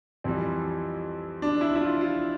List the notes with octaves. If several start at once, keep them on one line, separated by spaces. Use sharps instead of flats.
F2 E3 G3 C4
D4
E4
E4
F4
F4